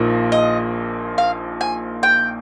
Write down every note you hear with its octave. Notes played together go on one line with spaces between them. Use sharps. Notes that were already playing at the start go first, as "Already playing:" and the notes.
Already playing: A#1 A#2 F3 A#3 D#4
D#5
F5
G#5
G5